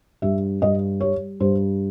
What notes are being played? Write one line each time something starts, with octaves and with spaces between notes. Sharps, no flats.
G2 E5
G2 D#5
G3 C#5
G2 C5